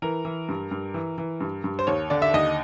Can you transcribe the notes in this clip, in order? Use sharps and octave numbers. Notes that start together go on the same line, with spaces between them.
E3 A#4
E3
G2
G2
E3
E3
G2
G2
C5
D#2 C#5
D3 D5
E5
D#2 D#5